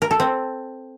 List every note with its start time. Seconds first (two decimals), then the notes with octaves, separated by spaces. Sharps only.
0.02 A#4
0.11 A4
0.20 C4